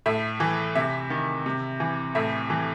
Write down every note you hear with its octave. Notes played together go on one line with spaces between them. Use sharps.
A2 E5
E3
C3 E5
D#3
C3
E3
A2 E5
E3